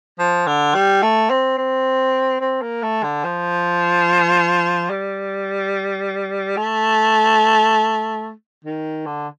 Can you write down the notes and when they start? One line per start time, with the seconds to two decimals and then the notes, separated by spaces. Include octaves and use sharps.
0.19 F3
0.47 D3
0.75 G3
1.03 A3
1.30 C4
1.58 C4
2.41 C4
2.62 A#3
2.83 A3
3.03 D3
3.24 F3
4.90 G3
6.57 A3
8.65 D#3
9.06 D3